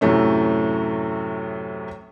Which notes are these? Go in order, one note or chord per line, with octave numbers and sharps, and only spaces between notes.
F#2 A2 C3 A3 C#4